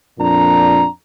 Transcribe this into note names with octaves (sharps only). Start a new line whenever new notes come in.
F2 A#2 D4 A#5